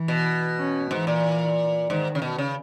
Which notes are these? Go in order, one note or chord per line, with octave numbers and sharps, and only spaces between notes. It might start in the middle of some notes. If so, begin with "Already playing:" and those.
Already playing: E3
B2
C#4
G#2 E3
A#2
G#2 D#3
C#3
B2
C#3